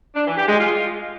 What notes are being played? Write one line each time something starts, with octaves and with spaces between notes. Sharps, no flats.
D4
E3
G4
G#3
F4